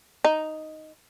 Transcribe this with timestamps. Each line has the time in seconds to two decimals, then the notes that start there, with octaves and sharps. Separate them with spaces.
0.24 D#4